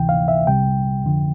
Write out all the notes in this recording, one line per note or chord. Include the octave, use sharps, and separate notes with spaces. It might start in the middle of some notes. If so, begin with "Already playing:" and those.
Already playing: D2 C3 E3 G5
F5
E5
C2 C3 G3 G5
F2 D3 F3